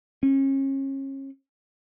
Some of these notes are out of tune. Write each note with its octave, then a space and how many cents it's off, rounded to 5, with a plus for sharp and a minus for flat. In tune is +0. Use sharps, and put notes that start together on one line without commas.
C#4 -35